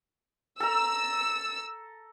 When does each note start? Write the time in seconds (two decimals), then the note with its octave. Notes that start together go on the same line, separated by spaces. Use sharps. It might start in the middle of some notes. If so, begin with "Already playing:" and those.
0.60 A4 A#5 E6